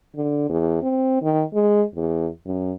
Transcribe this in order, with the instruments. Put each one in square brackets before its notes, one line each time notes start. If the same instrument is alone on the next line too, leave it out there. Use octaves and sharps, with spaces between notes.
[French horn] D3
E2
C4
D#3
G#3
E2
F#2